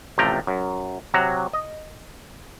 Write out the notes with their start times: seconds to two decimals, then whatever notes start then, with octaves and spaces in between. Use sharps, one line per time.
0.18 A1 C3 F3 A3 G5 A#5
0.47 F#2
1.14 C3 F#3 F#4 A#5
1.53 D#5